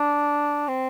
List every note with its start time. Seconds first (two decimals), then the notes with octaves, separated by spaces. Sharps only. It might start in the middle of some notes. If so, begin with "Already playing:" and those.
Already playing: D4
0.68 C4